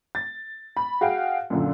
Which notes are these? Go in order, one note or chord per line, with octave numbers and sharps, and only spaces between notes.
A6
B5
F#4 G#4 F5 G5
F#2 A#2 D3